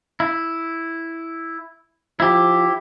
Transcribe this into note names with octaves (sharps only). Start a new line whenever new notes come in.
E4
F3 E4 G4